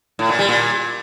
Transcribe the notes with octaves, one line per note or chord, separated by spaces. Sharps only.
A2
A#2
G3
A#2